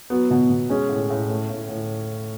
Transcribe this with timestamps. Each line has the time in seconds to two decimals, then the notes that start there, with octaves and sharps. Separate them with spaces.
0.10 F#3 B3
0.30 B2
0.50 B2
0.69 G#3 C#4
0.89 A2
1.10 A2
1.29 A3
1.50 A2
1.69 A2